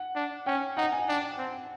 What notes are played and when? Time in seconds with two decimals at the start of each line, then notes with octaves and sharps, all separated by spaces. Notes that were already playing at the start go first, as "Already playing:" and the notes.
Already playing: F#5
0.16 D4
0.46 C#4 G5
0.77 D#4 F#5
0.92 G#5
1.09 D4
1.38 C4